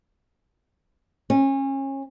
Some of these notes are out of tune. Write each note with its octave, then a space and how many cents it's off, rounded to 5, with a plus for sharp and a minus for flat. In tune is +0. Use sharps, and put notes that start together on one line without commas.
C#4 -30